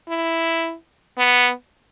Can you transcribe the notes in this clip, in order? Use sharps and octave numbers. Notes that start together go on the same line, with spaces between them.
E4
B3